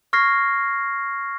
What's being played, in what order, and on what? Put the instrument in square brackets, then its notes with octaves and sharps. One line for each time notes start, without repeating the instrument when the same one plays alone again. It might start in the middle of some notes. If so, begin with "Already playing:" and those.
[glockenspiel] C#6 F6 G#6 A#6 C7